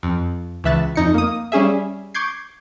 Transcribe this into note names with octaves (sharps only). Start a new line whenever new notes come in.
F2
C#2 E3 E5 F#6 A6
F2 D#4 C#7
A#3 D#6
G3 C#4 G#4 E5
C#6 D6 G6 G#6 C7